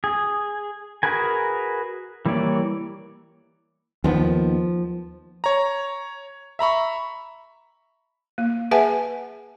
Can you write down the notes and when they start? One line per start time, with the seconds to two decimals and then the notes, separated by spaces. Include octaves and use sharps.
0.04 G#4
1.03 F#4 G#4 A#4 B4 G#5
2.26 E3 G3 A#3 C#5 D5
4.04 D#2 D#3 F3 B3
5.44 C#5 A#5
6.59 E5 A#5 B5 C#6
8.38 A#3
8.71 G#4 B4 E5 F#5 G#5 A5